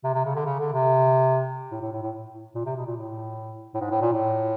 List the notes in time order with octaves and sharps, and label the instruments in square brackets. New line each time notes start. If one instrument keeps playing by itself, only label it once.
[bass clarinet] C3
C3
C#3
D3
C#3
D3
C3
A2
A2
A2
A2
A#2
C3
B2
A#2
A2
A2
G#2
A2
A#2
A2